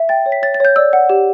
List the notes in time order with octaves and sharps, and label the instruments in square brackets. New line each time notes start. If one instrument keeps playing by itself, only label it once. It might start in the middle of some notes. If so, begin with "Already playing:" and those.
Already playing: [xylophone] E5
G5 A6
C#5
B6
C#5 A6
A6
C#5 G6
D5 E6
F#5
G4